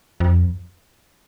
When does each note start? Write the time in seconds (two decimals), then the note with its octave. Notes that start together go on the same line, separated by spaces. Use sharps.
0.20 F2